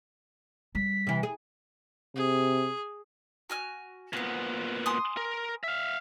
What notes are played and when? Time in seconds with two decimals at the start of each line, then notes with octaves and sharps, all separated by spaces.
0.75 G3 B6
1.07 C3 E3
1.23 G#4
2.16 C3 G#4
3.50 F#4 G#5 F6
4.13 A#2 B3 C4 F#4
4.86 G#5 C6 D#6
5.17 A#4
5.64 E5 F5